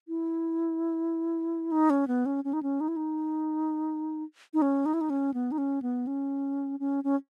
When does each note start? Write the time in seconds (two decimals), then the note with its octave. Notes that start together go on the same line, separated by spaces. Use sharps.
0.08 E4
1.72 D#4
1.90 C#4
2.08 B3
2.26 C#4
2.44 C#4
2.53 D#4
2.63 C#4
2.81 D#4
2.88 E4
2.96 D#4
4.54 D#4
4.62 C#4
4.86 D#4
4.94 E4
5.01 D#4
5.10 C#4
5.34 B3
5.52 D#4
5.58 C#4
5.82 B3
6.07 C#4
6.80 C#4
7.04 C#4